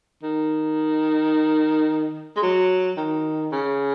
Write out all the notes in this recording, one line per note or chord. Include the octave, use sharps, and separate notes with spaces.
D#3
G#3
F#3
D#3
C#3